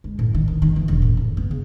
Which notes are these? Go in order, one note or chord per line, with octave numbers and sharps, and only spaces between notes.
G#3
A2
D#3
D#3
D#3
E3
E1
A2
F#1
B3
C#3